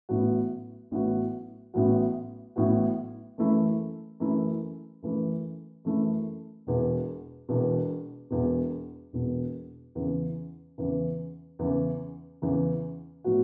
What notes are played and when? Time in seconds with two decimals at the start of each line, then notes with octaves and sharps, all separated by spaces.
0.09 A1 A2 F#3 B3 F#4
0.91 A1 A2 F#3 B3 F#4
1.74 A1 A2 F#3 B3 F#4
2.56 A1 A2 F#3 B3 F#4
3.38 F#2 E3 A3 E4
4.20 F#2 E3 A3 E4
5.02 F#2 E3 A3 E4
5.85 F#2 E3 A3 E4
6.67 E1 E2 B2
7.49 E1 E2 B2
8.30 E1 E2 B2
9.13 E1 E2 B2
9.95 E2 C#3 E3
10.78 E2 C#3 E3
11.59 E2 C#3 E3
12.42 E2 C#3 E3
13.24 A2 F#3 B3 F#4